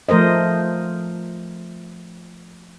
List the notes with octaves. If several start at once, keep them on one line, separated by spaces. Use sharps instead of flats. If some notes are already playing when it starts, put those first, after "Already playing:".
F3 A3 A#4 C5 D#5